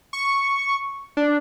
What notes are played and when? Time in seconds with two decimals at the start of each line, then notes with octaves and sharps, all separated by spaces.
0.13 C#6
1.17 D4